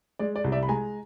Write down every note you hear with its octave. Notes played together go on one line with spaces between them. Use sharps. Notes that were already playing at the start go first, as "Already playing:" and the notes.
G#3 D5
D5
C2
D5 E5
B5
G#3 G#5 A#5